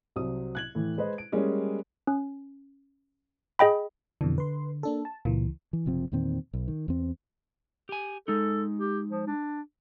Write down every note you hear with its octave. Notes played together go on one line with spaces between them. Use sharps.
C2 F#3 C4 D#6
F#6 G#6 F#7
A2 E3
G#3 B4 C5 D#5
D7
G3 G#3 A#3 C#4 G#4
C#4
G#4 D#5 G5 B5
F2 B2 D3 E3
B4 C6
A#3 D4 A4
A5
C#2 A#2 E3
E3
F#1 C3 F3 C4
E2 A#2 D#3 C4
B1
D#3
E2 C4
G4 G#5
G#3 D#4 A4
G4
F3
D4